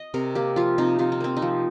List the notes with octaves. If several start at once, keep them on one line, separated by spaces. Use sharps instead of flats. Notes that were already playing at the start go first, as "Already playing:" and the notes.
Already playing: D#5
C3 A#4
A#3 G4
F3 F4
C3 D#4
C3 F4
D#4
A#3 C4
D#4
F3